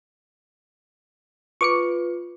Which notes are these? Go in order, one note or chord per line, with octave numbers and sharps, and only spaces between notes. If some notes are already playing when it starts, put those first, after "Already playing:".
F4 B4 C#6 D6 C#7